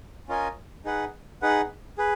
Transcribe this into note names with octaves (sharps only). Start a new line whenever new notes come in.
C#4 F4 A#4 D#5 G#5
D#4 G#4 B4 F#5
D#4 G#4 B4 F#5
G#4 B4